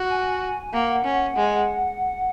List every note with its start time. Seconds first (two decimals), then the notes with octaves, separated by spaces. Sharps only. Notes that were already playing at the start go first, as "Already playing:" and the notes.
Already playing: F#4
0.10 G#5
0.42 G#5
0.74 A#3 F#5
1.05 C#4
1.36 G#3